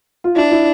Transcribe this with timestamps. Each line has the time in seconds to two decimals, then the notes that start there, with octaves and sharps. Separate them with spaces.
0.24 F4
0.36 D4 E4
0.52 E4